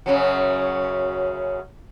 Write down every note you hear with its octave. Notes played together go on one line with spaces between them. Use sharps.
F#2 C#3 F#3